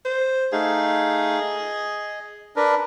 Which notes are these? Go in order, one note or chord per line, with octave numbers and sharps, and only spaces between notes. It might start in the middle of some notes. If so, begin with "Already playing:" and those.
C5
A3 D#4 G#4 F5
D#5
D4 A#4 B4